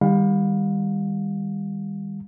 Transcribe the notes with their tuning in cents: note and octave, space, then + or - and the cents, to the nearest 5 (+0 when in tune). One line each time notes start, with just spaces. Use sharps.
D#3 +0 G3 +25 F5 +35